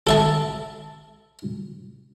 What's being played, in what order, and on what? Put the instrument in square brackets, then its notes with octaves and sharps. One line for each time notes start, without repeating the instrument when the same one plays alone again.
[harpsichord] A4 E5 A5